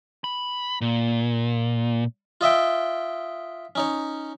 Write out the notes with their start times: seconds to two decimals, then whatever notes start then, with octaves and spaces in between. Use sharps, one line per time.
0.24 B5
0.81 A#2
2.41 F4 D#5 E5 G5
3.75 C#4 D#4 C#5